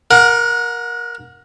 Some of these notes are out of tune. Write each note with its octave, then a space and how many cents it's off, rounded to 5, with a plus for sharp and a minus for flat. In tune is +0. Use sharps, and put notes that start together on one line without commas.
A#4 +15 F#5 -30